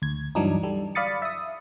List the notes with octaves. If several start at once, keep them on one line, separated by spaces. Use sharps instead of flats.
D2 G#6
G2 E3 F#3 D4 D#4
G3 A4
D5 F5 B5 D#6 A6 C#7
E5 D#6